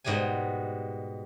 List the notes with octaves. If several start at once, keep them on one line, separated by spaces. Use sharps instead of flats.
G#2 B2 G3 F#5 G#5